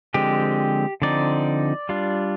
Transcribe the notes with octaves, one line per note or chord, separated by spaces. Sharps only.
D3 F3 G#3 C4 G4
D3 F3 C4 D#4 D5
G3 D4 F4